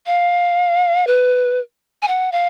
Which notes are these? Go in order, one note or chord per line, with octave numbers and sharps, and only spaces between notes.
F5
B4
G#5
F#5
F5